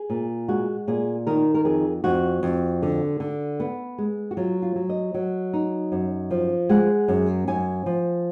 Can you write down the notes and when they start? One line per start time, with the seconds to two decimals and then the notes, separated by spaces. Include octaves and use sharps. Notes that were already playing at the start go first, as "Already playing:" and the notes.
Already playing: G#4
0.10 A#2
0.48 G#3 F#4
0.88 A#2 G#4
1.27 D#3 A#4
1.55 A#4
1.65 F2 G#4
2.04 F2 F#4
2.43 F2
2.82 D3
3.20 D3
3.60 B3
3.98 G#3
4.31 F#4
4.37 F#3 F4
4.62 F4
4.76 F#3
4.89 D#5
5.14 F#3
5.53 D#4
5.92 F#2
6.31 F3
6.69 G#3 F#5
7.08 F#2
7.48 F#2 G#5
7.86 F3